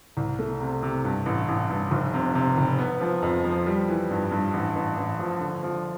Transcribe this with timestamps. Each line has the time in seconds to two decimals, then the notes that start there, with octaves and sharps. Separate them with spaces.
0.17 C2
0.39 A3
0.60 C3
0.83 C3
1.04 G2
1.26 A1
1.48 A1
1.69 G2
1.91 F1
2.14 C3
2.35 C3
2.57 F1
2.78 B3
3.01 F3
3.22 F2
3.44 F3
3.67 G3
3.89 E3
4.11 G2
4.31 G2
4.53 A1
4.76 A1
4.97 A1
5.19 F3
5.41 D3
5.63 F3